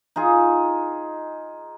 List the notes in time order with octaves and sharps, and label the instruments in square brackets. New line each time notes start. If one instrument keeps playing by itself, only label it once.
[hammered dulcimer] D#4 F4 G#4